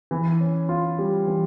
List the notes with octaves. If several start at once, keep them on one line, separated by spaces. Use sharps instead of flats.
E3
C#4
F4
G3
E3